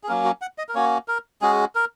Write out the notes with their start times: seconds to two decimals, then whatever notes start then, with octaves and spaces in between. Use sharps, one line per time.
0.04 G#4
0.08 F#3 A#3 C#4 A#4
0.25 F#4
0.42 F#5
0.58 D#5
0.69 A#4
0.75 A#3 C#4 F#4 C#5
1.08 A#4
1.42 G#3 C#4 F#4 G#4
1.75 A#4